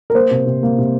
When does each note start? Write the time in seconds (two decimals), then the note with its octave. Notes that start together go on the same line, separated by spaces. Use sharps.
0.10 A#4
0.15 A#3 C5
0.31 C3
0.46 C3
0.63 A#3
0.78 C3